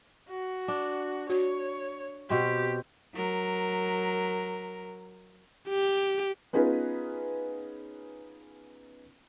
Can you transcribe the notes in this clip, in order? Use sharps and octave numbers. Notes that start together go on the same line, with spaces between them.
F#4
D4
F#4 C#5
B2 C4 G4
F#3 A#4
G4
B3 C#4 D#4 F4 G#4 B4